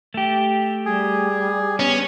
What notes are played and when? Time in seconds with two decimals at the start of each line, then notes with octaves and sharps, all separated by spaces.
0.14 A3 G4
0.86 G3 G#4
1.79 B3 C#4